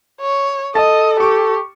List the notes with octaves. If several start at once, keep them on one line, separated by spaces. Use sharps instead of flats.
C#5
A4 D#5 A5
G4 C#6